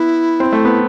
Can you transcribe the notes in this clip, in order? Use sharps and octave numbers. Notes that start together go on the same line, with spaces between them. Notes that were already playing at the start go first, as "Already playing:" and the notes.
Already playing: B3 E4
C4
A3
B3